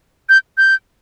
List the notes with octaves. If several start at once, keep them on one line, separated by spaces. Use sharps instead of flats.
G6
G6